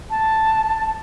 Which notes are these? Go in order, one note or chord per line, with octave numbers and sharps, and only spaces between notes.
A5